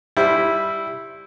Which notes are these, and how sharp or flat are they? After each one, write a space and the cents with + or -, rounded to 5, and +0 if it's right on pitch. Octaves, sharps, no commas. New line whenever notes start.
G3 +5 E4 +0 C5 +5